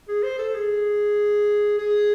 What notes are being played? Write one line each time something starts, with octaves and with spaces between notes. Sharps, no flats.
G#4
C5
A4
G#4
G#4